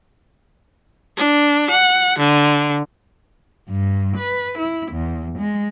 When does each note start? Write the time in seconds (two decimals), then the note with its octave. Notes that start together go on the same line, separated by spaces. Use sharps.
1.17 D4
1.69 F#5
2.18 D3
3.70 G2
4.17 B4
4.59 E4
4.92 E2
5.39 G#3